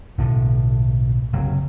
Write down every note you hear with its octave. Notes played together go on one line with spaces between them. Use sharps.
B1 A2 D3
F#1 C3 F#3